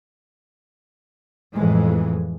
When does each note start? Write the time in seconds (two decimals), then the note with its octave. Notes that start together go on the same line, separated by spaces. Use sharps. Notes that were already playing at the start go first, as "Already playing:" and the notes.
1.53 F2 A2 E3 G#3